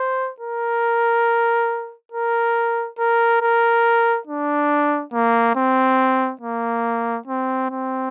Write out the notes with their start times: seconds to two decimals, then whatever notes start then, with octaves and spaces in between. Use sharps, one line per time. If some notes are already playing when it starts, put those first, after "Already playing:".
Already playing: C5
0.40 A#4
2.12 A#4
2.98 A#4
3.41 A#4
4.27 D4
5.14 A#3
5.56 C4
6.41 A#3
7.27 C4
7.71 C4